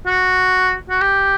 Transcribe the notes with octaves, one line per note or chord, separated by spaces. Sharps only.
F#4
F#4
G4